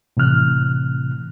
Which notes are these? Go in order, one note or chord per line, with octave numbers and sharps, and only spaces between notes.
A2 C3 E3 F6 F#6